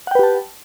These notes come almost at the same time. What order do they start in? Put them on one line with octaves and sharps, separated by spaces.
F#5 G5 B4 G4 A5